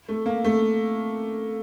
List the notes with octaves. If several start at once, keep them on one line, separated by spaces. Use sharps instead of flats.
A3
A#3
A3